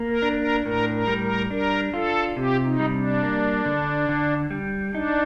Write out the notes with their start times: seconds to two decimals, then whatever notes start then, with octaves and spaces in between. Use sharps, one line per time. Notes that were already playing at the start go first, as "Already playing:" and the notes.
Already playing: A#3
0.08 A#4
0.22 D4
0.36 A#4
0.65 A2 A#4
0.94 A#4
1.07 G3
1.22 A#4
1.51 D4 A#4
1.94 F4 A4
2.37 C3 G4
2.66 D#4
2.79 G3
2.94 D4
3.23 A#3
3.65 D3
4.09 D3
4.51 G3
4.93 D4 D#4